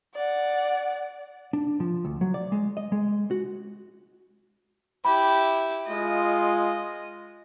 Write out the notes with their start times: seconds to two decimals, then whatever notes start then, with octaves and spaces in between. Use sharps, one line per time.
0.15 D5 F#5
1.53 D4
1.80 F3
2.05 D2
2.21 F#3
2.34 D5
2.52 G#3
2.77 D#5
2.92 G#3
3.31 F#4
5.05 E4 G4 B5
5.87 G#3 F4 D#5